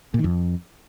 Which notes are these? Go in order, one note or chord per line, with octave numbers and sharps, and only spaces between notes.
A#2
D#3
F2